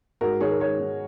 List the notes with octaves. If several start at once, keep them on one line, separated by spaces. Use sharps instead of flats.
G#2 F#4 A#4
D#3 G#4 C#5
A#4
G#2 G#4 C#5
D#3